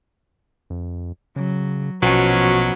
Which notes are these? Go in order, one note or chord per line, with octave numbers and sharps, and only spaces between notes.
F2
C#3 F#3
A#1 B2 F3 F#3 B3 C#4